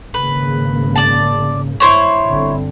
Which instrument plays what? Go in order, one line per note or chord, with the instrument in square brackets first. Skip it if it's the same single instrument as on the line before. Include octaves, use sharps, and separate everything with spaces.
[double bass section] G#1 C#3 A#3 [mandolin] B4
[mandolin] D5 A5
[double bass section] G2 [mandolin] E4 C5 C#5
[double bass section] G1 D3 C4